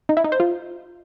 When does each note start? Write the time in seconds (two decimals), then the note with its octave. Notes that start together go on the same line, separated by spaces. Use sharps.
0.09 D#4
0.17 E4
0.24 D#4
0.32 C5
0.40 F4